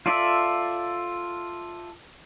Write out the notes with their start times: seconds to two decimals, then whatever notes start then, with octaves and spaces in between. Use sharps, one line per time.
0.06 F4 A4 D5 E5